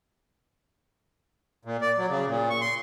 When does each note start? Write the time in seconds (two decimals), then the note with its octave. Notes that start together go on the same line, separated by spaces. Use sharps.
1.65 A#2
1.81 D5
1.98 F#3
2.09 C#3
2.26 A#2
2.50 C#6
2.61 C6